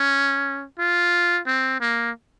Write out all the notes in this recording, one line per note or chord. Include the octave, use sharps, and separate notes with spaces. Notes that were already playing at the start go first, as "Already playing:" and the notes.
Already playing: C#4
F4
C4
A#3